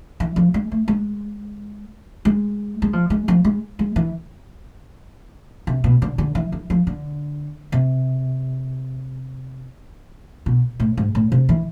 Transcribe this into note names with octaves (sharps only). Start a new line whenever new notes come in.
E3
F3
G#3
A3
G#3
G#3
G#3
F3
G#3
F3
G#3
G#3
E3
C3
B2
D3
D3
E3
E3
F3
D3
C3
B2
A2
G#2
A2
C3
E3